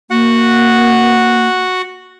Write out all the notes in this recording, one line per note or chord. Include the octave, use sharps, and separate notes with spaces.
A#3 F#4 F#5